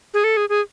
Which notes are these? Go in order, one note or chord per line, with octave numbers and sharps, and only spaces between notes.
G#4
A4
G#4
G#4